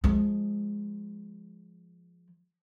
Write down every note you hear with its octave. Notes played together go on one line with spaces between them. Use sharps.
F3 G#3